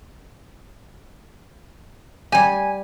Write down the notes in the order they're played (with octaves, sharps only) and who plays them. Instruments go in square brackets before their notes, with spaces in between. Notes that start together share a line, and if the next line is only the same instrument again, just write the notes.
[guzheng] G3 G4 [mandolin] G#5